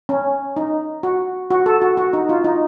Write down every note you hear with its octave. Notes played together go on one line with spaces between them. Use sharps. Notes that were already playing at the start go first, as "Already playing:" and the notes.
C#4
D#4
F#4
F#4
A4
F#4
F#4
D#4
F4
D#4